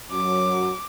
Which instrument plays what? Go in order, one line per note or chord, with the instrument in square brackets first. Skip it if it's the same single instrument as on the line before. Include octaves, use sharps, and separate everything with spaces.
[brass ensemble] F#2 F#3 [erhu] D6